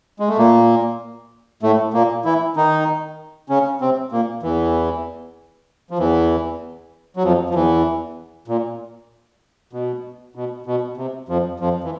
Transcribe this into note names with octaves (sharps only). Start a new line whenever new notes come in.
G#3
A3
A#2 A#3
A2 A3
A#2 A#3
E3 E4
D#3 D#4
C#3 C#4
C3 C4
A#2 A#3
E2 E3
F3
E2 E3
F#3
F2 F3
F3
E2 E3
A#2
B2
B2
B2
C3
F2 F3
F2 F3
E3